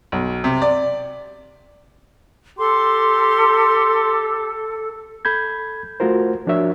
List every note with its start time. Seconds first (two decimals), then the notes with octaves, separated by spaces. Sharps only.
0.12 B1
0.44 C3
0.62 D5
2.58 G4 A4 C6
5.25 A4 B5 G6 G#6
6.00 A3 F4 F#4 A#4 C5
6.47 F3 D4 F#4 A#4 C#5 E5